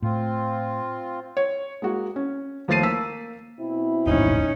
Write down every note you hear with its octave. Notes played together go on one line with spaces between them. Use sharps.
A2 C4 F4
C#5
G#3 A#3 F#4
C#4
D#2 F3 A3 A6 C7 D#7
A#3 E6 B6
B2 C4 E4
D#1 A1 G#2 C#4 D#4